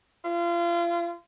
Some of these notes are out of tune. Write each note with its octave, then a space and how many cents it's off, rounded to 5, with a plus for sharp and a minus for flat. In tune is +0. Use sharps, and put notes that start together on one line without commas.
F4 -30